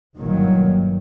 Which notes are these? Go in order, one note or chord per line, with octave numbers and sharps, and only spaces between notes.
G1 G2 A#2 D#3 F#3